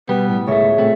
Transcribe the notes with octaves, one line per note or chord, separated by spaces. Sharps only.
B2 G3 B3
A2
C#2 A3 G#4 C#5 E5
A#2 A3 C4 A4